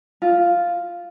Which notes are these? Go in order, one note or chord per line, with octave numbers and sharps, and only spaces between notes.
F4